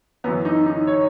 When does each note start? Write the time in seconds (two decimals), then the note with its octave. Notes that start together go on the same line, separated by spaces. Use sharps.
0.24 F#2 E3 B3
0.45 D#4
0.66 D#4
0.87 C#5